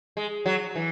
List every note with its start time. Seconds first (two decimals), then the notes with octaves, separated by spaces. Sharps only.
0.17 G#3
0.46 F#3
0.76 E3